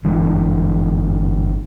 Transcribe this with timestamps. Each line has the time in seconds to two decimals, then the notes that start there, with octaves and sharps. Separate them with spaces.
0.03 G1 E3 G#3 D4